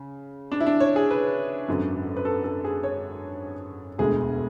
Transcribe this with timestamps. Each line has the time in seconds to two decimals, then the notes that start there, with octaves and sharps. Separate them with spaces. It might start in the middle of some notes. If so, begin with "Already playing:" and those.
Already playing: C#3
0.52 D4
0.60 E4
0.67 D4
0.80 C#5
0.96 G#4
1.11 B4
1.68 G#1 F#2 D3 F#3
2.17 B4
2.25 A4
2.44 A4
2.64 G#4
2.83 C#5
3.98 E1 D2 D3 G#3 G#4